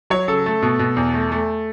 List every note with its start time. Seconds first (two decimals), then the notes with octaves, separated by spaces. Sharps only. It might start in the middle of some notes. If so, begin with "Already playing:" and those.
0.10 F#3 C#5
0.28 C#3 A4
0.46 A3
0.62 B2
0.79 B2
0.97 E2
1.14 A3
1.32 A3